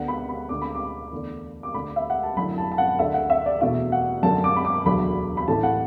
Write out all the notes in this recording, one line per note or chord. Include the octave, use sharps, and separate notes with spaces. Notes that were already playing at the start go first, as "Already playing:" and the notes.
Already playing: D2 D3 B3 D4 F#5
B5
B5
D2 D3 A3 D4 D6
B5
D6
E2 D3 A3 D4
D6
D2 D3 A3 D4 B5
E5
F#5
A5
F#1 F#2 D3 A3 E4 B5
A5
A5
F#5
D2 D3 A3 E5
F#5
E5
D5
E2 B2 A3 D4 E5
F#5
F#2 D3 A3 A5
D6
B5
D6
E1 D2 D3 F#3 B5
B5
A1 A2 A3 A5
F#5